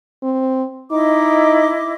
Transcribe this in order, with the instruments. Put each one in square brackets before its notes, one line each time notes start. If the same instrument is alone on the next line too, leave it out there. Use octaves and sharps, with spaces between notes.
[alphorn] C4
[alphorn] D#4 [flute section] E4 D#5 D6